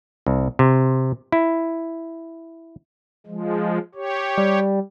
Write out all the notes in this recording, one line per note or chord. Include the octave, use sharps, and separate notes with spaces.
C2
C3
E4
F3 G#3
G4 C#5
G3